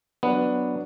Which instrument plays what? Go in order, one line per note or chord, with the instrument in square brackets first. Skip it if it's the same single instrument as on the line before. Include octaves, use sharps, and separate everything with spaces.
[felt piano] F#3 D4 [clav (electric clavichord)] B3